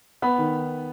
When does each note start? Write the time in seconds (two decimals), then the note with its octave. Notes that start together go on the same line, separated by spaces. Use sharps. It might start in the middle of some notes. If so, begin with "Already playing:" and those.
0.22 B3 B5
0.38 D#3